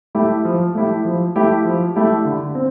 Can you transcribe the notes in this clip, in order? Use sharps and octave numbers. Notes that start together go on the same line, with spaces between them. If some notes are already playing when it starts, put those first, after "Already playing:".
A3 E4 G4
F3
A3 E4 G4
F3
A3 E4 G4
F3
A3 E4 G4
D3
C4